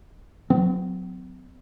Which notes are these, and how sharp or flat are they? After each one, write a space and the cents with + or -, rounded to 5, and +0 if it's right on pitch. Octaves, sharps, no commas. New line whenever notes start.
F#3 -20 C4 -45